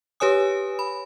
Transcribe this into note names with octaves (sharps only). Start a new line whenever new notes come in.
G4 B4 C#5 G#5 D#6
B5